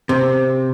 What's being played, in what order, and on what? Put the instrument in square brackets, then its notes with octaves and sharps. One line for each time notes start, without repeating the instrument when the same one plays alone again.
[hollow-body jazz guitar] C3